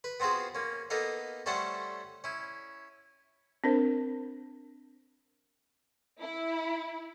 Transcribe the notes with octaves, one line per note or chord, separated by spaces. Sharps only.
B4
B3 C4 F4 F#4 G#4
A#3 C#4
A#3 B3 D#4 A4 F5
G3 A3 C#4 A4 C5 F#5
C#4 E4
C4 D4 A#4 C5
E4